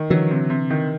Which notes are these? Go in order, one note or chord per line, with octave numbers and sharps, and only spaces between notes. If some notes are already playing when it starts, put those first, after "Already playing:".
Already playing: D#3
D3 E3 F#3
C3
C3
D#3